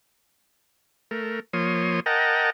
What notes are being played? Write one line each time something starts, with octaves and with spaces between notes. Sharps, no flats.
A3 A#4
F3 A#3 C#5 C6 D#6
A#4 D#5 F#5 G5 A5 A#5